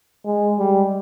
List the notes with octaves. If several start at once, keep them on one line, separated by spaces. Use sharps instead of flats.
G#3
G3